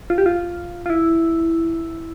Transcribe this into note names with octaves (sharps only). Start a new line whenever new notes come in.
F4
G4
F4
F4
E4